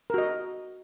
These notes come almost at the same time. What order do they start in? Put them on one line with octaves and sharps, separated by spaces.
A#4 F#4 D#5